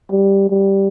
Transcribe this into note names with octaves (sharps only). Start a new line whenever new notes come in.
G3
G3